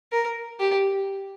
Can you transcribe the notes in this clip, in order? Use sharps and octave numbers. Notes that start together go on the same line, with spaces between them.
A#4
G4